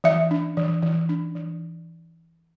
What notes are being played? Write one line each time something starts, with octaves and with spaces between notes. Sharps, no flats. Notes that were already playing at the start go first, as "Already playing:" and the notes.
E3 E5
D4
E3
E3
D4
E3